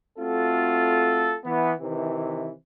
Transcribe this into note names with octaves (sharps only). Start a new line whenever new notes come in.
A3 C4 F4 F#4 A4
E3 B3
C3 D#3 E3